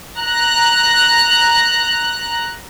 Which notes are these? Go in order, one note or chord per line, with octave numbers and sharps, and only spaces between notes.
A#5 F#6